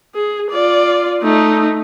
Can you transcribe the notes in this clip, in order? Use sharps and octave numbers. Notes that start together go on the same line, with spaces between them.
G#4
F4 D5
A3 D#4